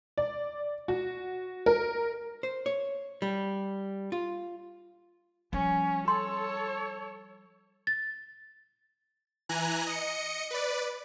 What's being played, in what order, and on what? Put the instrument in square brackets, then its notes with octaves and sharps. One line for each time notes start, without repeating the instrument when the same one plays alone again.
[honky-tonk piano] D5
F#4
A#4
[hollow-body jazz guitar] C5
C#5
G3
F4
[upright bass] F3 G3 [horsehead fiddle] C#4
[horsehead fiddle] A4 C#5 [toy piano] C6
[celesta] A6
[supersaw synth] E3 G#5 A#5 F#6
D#5 C#7
B4 D5